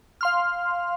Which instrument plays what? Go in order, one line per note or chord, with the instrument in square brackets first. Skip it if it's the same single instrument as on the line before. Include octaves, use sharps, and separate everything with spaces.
[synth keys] F5 C6 F6